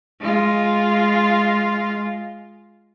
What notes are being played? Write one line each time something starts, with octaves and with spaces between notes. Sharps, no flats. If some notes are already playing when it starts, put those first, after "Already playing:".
G#3 F4